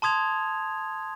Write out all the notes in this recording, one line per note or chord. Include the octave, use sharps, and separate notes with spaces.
A5 C6 D#6 G#6 F7